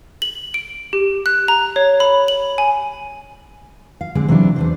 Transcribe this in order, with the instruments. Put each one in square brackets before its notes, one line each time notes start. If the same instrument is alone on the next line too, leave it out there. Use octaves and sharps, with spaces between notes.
[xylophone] F#7
D7
G4
F#6
A#5
C#5
B5
F#7
G#5
[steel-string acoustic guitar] F5
D3 G#3 C4
C3 E3 F#3 C#4 D4
E2 D4 C5